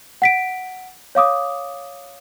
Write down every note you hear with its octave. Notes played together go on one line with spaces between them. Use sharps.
F#5 B6 D7
C#5 F5 D6 D#6